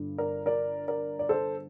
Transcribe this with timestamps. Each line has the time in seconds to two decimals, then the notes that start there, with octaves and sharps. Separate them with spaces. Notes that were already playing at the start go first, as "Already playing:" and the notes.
Already playing: G1 G2 D3
0.18 A#4 D5
0.46 A#4 D5
0.88 A#4 D5
1.19 D5
1.29 A4 C5